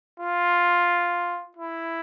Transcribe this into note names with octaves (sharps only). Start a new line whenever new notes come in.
F4
E4